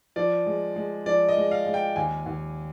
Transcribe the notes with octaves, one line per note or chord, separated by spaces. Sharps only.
F3 D5
G#3
G#3
F3 D5
D#5
G#3
F5
G#3
G5
D#2 G#5
D#2